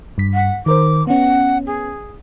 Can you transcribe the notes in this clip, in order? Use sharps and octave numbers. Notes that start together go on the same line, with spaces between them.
G2 B6
F#5
D#3 A#4 C5 D6
B3 C#4 F#5
G#4